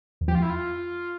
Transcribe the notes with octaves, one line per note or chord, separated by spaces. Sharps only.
E2
F2 G4
F4
E4
F4